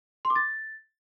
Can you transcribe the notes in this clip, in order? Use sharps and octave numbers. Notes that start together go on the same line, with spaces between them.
C6
D6
A6